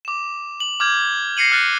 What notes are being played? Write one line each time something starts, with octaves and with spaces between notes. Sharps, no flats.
D6 E7
F#7
D6 F6 G6 G#6
A#6 C7 C#7 D#7 F#7
F6 F#6 A6 D#7